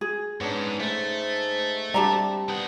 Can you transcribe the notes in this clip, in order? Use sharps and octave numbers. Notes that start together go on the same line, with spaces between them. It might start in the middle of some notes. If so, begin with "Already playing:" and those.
G#4
G#2 B3 C#4 D4
G#2 A3
G3 C4 D4 G4 A5 A#5
B3 D#4 F#5